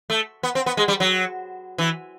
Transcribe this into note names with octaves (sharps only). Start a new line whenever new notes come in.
A3
B3
C4
B3
G#3
G3
F#3
E3